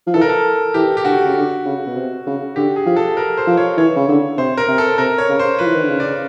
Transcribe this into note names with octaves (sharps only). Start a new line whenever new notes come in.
F3
E3 A4
A#4
A4
E3 G4
G4
D3 F#4
C#3
D3
C#3
B2
C3
C#3
D3 G4
G#4
F3
A4
A#4
C5
F3
C#5
E3 C#5
C#3
D3
C3 C5
A#4
C3
A4
C3 A#4
C#5
C#3
C5
F3 B4
E3
D#3
D3
C#3
D5